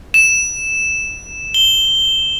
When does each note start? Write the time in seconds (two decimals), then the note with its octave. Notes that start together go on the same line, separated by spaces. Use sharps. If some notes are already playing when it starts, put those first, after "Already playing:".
0.14 E7
1.54 G7